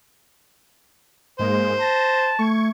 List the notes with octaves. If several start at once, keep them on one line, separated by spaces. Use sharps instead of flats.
G#2 G#3 A#3 C5
A5 A#6
A3 C#6 G#6